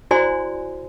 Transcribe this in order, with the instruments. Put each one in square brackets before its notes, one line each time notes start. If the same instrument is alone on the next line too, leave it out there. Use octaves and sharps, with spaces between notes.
[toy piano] E4 F#4 C5 D5 G#5 C6